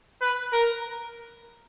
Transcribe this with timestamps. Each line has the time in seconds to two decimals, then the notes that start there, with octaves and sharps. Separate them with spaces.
0.21 B4
0.53 A#4